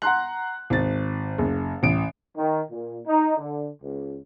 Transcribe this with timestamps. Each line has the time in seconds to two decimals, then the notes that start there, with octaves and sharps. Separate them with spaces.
0.02 F#5 A#5 C6 F#6
0.70 G#1 A6
1.38 F#1
1.83 A1 D7
2.37 D#3
2.71 A#2
3.06 D#4
3.38 D3
3.81 C#2